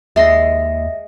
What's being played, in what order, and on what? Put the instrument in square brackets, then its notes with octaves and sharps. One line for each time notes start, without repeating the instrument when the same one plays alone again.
[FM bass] D#2 [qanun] G#3 C6 [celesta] E5 A#6